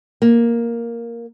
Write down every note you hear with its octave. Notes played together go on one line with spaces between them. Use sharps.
A#3